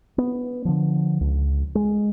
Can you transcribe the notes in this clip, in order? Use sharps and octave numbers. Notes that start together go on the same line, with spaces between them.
B3
D3 F3
C#2
G#3